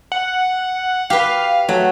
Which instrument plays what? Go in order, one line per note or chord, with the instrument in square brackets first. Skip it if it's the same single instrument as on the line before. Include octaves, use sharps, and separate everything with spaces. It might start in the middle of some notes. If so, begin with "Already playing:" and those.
[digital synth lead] F#5
[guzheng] G4 B4 [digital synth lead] F5
[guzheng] F#3 [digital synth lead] A3